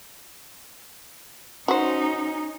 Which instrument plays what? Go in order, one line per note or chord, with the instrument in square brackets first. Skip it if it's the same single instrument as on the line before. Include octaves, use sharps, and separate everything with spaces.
[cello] C#4 D#4 [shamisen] F#4 C5